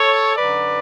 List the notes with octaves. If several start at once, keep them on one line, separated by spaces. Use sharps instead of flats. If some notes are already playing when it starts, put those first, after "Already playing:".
Already playing: A4 C#5
F#2 D3 F#3 B4 D5